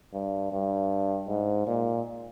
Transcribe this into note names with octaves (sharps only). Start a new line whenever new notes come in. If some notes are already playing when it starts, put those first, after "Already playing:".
G2
G2
G#2
A#2